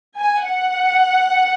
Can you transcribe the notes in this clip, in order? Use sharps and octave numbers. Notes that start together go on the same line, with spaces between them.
G#5
F#5